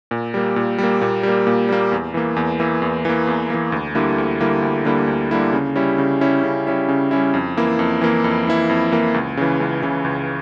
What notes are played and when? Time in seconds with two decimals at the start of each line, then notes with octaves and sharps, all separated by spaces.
0.11 A#2
0.34 G3 A#3
0.56 A#2
0.78 G3 A#3
1.01 A#2
1.23 G3 A#3
1.47 A#2
1.69 G3 A#3
1.92 E2
2.14 E3 A#3
2.36 E2
2.60 E3 A#3
2.82 E2
3.05 E3 A#3
3.27 E2
3.50 E3 A#3
3.72 D2
3.95 D3 G3 A#3 E4
4.18 D2
4.40 D3 G3 A#3 E4
4.62 D2
4.85 D3 G3 A#3 E4
5.08 D2
5.31 D3 G3 A#3 E4
5.53 C#3
5.76 G3 C#4 E4
5.98 C#3
6.21 G3 C#4 E4
6.43 C#3
6.67 G3 C#4 E4
6.89 C#3
7.11 G3 C#4 E4
7.34 F2
7.57 E3 A#3 E4
7.79 F2
8.01 E3 A#3 E4
8.24 F2
8.47 E3 A#3 E4
8.69 F2
8.92 E3 A#3 E4
9.14 C#2
9.37 C#3 E3
9.60 C#2
9.82 C#3 E3
10.05 C#2